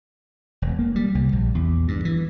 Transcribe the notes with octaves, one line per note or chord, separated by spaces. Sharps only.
E1
A#3
G3
C2
A#1
E2
G2
E3